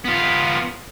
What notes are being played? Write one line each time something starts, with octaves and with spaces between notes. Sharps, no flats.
B3 F4